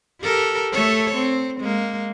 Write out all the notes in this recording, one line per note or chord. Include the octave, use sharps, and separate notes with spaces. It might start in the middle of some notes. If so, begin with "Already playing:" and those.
G4 A4 A#4
A3 A4 C#5
C4
G#3 A#3